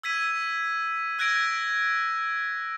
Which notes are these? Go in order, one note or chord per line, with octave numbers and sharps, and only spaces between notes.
E6 G#6 B6 D#7
E6 F#6 G#6 A#6 D7